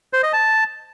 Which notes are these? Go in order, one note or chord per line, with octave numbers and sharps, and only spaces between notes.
C5
D#5
A5